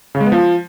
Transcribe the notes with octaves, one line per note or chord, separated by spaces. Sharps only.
C#3
G#3
B3
F3